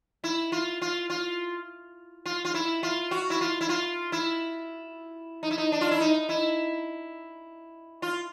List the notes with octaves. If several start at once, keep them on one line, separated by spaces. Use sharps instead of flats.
E4
F4
F4
F4
F4
F4
E4
F4
F#4
E4
F4
E4
F4
E4
D#4
E4
D#4
D4
F4
E4
D#4
E4
F4